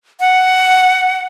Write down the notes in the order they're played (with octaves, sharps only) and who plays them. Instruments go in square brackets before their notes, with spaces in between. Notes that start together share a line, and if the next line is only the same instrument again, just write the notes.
[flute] F#5